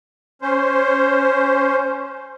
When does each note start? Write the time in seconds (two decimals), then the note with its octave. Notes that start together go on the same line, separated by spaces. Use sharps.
0.42 C#4 C5